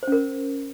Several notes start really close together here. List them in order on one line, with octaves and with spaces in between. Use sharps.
C5 C#4 A#4